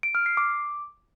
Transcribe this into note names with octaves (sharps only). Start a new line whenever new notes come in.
D7
F6
C7
D6